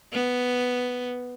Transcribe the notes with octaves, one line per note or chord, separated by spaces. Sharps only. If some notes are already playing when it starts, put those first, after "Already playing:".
B3